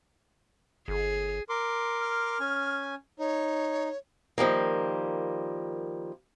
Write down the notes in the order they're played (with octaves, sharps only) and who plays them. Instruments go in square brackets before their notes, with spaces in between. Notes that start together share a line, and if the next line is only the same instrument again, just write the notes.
[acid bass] G1 [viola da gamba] G#4
[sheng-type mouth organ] A#4 C6 D6
[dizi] F6
[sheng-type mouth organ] C#4 G#5
[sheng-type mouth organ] D#4 [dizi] C#5
[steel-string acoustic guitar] D#3 F3 G3 A#3